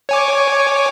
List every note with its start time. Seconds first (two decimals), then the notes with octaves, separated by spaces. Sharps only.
0.09 C#5 G#5 D6